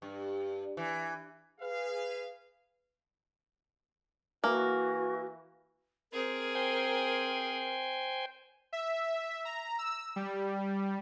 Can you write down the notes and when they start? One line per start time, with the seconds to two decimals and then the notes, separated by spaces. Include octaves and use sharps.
0.02 G2
0.77 E3
1.60 G#4 B4 F5
4.44 E3 A#3 F#4
6.13 C4 G#4 A#4
6.55 C5 G5 G#5
8.73 E5
9.45 A#5
9.79 E6
10.16 G3